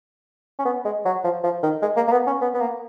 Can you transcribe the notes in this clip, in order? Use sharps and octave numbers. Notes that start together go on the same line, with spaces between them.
C#4
B3
G#3
F#3
F3
F3
D#3
G#3
A#3
A#3
B3
C#4
B3
B3
A#3